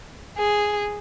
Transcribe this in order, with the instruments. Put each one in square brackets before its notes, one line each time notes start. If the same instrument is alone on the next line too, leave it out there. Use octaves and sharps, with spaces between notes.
[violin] G#4